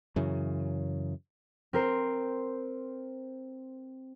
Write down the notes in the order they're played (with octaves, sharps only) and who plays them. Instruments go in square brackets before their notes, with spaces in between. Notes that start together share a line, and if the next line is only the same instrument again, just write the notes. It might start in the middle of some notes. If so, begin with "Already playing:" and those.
[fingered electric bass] F#2 C#3 E3
[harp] C4 A#4 C5